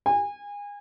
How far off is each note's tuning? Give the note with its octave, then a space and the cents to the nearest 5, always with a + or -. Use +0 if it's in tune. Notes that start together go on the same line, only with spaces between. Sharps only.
G#5 -30